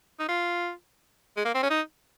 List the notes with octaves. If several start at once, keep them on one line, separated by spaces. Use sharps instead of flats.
D#4
F4
G#3
A#3
C4
C#4
D#4